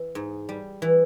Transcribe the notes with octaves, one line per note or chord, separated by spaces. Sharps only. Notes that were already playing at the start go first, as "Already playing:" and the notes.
Already playing: E3
G#2
G3
E3